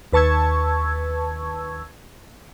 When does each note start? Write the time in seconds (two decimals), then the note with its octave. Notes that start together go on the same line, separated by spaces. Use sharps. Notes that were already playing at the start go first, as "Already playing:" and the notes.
0.13 D#2 B4 A5 C#6 E6 G#6